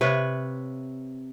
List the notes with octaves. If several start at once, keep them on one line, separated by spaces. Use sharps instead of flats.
C3 B4 C#5 F5